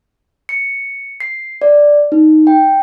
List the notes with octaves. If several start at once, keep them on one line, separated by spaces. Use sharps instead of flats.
C#7
C7
D5
D#4
G5